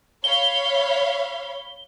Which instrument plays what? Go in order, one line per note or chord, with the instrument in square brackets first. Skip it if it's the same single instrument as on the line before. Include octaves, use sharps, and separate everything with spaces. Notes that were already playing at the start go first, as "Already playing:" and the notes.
[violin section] C#5 F5 B5 [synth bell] G7